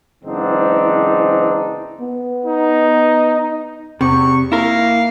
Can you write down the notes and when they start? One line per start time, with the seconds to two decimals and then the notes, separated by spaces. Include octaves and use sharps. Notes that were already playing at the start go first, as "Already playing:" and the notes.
0.24 F#1 G#2 E3 C4 D4 D#4
2.01 B3
2.45 D#4
4.01 E2 C3 C#6
4.52 A#3 E4 A#4 F5